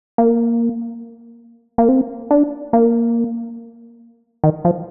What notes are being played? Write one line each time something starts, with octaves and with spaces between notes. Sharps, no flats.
A#3
A#3
C4
D4
A#3
D#3
F3